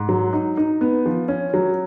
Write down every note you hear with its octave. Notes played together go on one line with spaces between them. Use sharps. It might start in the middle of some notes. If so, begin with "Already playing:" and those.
Already playing: G#2
F#3
D#4
D#4
B3
F3
C#4
F#3